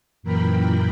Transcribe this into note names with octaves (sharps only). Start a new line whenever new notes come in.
F#2 A#2 E3 A#4 G5 B5